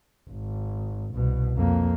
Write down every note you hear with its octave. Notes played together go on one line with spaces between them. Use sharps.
G#1
C2 B2
F2 A#3